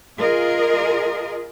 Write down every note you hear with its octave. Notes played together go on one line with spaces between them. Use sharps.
F4 G#4 A#4 D#5